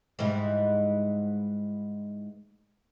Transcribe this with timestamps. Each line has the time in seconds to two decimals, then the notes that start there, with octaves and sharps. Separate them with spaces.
0.19 G#2 E3 G3